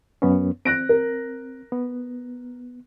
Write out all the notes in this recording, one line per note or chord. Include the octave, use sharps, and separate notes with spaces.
F#2 B3 C#4
C4 F#6 A#6 D7
A#4
B3